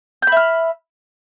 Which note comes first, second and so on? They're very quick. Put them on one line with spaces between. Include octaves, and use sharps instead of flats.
G6 B5 E5 F6